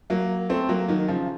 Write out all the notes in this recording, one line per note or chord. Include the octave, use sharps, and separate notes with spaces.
F#3 A#3
A3 C4
F#3 A#3
D#3 F#3
C#3 F3